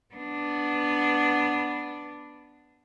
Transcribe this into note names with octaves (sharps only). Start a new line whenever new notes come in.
B3 D4